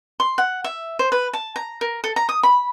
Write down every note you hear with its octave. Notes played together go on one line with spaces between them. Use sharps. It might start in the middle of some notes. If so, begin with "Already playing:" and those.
C6
F#5
E5
C5
B4
A5
A#5
A#4
A4
A#5
D#6
B5